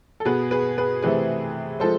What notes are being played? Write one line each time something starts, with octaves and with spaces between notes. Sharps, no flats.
A4
B2 B3 G#4 B4
G#4 B4
G#4 B4
C3 E3 A3 C4 G#4 B4
F3 G#3 C4 A4 C5